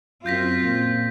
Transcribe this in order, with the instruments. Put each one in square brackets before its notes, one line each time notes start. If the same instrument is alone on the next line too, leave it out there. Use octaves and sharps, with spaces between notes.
[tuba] F#2 [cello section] C4 F4 [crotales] G6 A#6 B6
[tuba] A#2